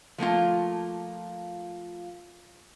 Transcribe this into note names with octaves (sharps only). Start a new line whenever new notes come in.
F3 A3 A#3 F4